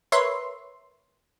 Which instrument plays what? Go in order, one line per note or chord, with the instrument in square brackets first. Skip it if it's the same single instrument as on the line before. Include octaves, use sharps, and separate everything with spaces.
[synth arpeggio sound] A#4 B4 C#5 E5 C6